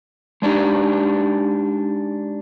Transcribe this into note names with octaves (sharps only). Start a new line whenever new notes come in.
G#3 D4 D#4 G4